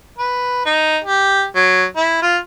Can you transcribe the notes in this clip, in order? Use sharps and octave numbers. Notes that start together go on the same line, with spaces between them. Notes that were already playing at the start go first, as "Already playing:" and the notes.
B4
D#4
G4
F#3
E4
F4